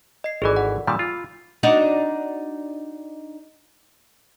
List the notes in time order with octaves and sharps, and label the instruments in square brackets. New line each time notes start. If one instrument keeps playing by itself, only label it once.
[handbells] D#5 C7
[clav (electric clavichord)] G#1 E3 [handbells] G#4 A4 D5
[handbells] F#5
[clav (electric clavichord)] A#2 D#3 G3 [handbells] B5 E6
[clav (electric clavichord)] F4
[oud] D4 D#4 F#4